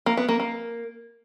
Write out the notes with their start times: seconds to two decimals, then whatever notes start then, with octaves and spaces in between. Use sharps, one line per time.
0.06 A#3
0.17 B3
0.29 A#3
0.40 A#3